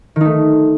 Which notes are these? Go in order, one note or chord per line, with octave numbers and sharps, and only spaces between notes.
D#3 A3 D#4